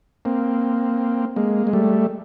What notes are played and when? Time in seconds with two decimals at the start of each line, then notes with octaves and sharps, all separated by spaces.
0.25 A#3 C4
1.36 G#3 A#3
1.67 G#3
1.73 G3 A3